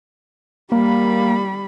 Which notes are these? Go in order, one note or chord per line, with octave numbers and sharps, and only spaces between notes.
G3 A#3 B5